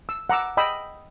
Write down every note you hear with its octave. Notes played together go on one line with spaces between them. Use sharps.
E6
F#5 A#5 D6 E6
D#5 G5 B5 D#6 E6